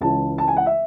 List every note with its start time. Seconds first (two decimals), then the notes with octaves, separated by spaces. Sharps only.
0.01 C#2 C#3 E3 A5
0.38 A5
0.48 G#5
0.57 F#5
0.66 E5